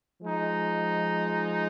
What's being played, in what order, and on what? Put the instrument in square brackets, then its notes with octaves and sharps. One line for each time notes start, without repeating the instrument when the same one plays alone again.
[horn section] F3 G#3 D#4